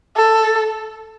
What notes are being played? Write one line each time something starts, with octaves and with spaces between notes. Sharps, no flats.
A4